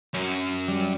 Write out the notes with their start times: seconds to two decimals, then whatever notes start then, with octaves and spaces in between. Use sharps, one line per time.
0.14 F#2 C#4
0.67 G3